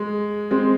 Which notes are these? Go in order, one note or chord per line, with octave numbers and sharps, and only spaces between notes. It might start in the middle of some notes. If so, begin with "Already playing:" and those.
Already playing: G#3
G#3 C4